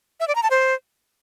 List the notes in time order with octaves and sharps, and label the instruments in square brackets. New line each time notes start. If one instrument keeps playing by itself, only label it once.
[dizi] E5
D5
A#5
A5
C5